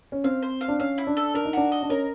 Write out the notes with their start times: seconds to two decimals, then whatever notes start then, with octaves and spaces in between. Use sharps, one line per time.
0.12 C#4
0.24 C4 F5
0.42 C5
0.61 F5
0.68 D4
0.79 C#4 F5
0.98 E4
1.07 D4
1.17 A4
1.34 D4 A#4
1.45 D#4
1.53 D4 F#4
1.72 D#5
1.83 D4
1.89 C#4 A#4